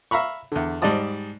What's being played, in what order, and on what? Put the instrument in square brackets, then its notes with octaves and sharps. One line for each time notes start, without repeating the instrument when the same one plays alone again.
[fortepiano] E5 F5 A#5 B5 C#6
E2 D3
G#2 G3 D5 D#5 A5 D#6